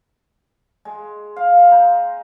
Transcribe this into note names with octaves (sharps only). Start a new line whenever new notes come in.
G#3
F5
D#4